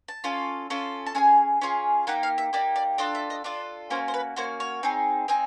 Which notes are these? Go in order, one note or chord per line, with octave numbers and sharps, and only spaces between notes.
A5
C#4 F4 A4
C#4 F4 A4
A5
C#4 F4 G#4 G#5
C#4 F4 G#4
A#3 D#4 G4 F#5
F5
E5
A#3 D#4 G4 D5
D5
D4 F4 A4 D#5
E5
D#5
D4 F4 A4 D5
A#3 C#4 F#4 C5
C5
B4
A#3 C#4 F#4 C5
C#5
C4 D#4 G#4
C4 D#4 G#4